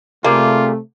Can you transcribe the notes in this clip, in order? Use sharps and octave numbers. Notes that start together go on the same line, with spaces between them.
C3 A3 A#3 F4 G4 G#4 D5